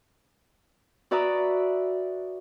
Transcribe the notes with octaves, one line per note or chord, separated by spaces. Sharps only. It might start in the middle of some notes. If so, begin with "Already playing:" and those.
F#4 B4 D5 E5 A#5 D#6